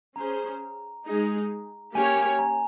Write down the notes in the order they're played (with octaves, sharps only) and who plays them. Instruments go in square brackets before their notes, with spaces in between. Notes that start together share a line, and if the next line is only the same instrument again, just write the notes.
[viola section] C#4 G#4 C5 [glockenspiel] A#5
[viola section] G#3 D#4 G#4
[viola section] A#3 C#4 G4 C#5 [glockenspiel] G#5
[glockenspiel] G#5
A#5